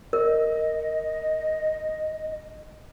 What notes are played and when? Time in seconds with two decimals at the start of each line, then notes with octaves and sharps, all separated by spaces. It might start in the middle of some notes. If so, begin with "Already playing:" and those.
0.13 A#4 D#5